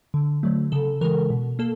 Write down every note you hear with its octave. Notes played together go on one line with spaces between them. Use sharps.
D3
F#3 A3
C#3 A4
E3 G#3 A#4
B2
A#3 A4